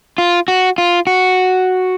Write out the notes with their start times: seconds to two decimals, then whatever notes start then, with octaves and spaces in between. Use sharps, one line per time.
0.18 F4
0.48 F#4
0.78 F4
1.07 F#4